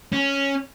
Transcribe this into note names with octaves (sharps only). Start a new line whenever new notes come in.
C#4